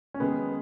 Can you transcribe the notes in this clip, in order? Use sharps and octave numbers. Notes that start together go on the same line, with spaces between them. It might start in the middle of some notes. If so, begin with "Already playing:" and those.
C#4
F#2 D#3 G#3 B3 D#4 G#4